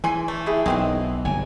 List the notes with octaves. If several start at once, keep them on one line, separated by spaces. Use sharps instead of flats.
E3 G#4 G#5 C6
A3
E4 G#4 G5
B1 D#3 E3 C4 D#5 C6
G1 G#5